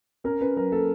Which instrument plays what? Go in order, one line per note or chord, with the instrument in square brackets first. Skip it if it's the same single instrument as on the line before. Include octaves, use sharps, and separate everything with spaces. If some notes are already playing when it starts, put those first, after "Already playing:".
[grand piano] C#4 A#4
C#4 B4
F#3 A#4
A#3 A4